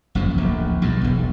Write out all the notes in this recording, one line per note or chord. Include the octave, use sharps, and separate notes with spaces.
G1 F#2 A#2 F3
D1 A#1 E2
B1 E2 G2
E1 B1